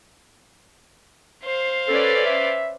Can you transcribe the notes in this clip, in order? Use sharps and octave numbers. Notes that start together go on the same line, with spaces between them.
C5 F5
C#4 A4 B4 D5
E5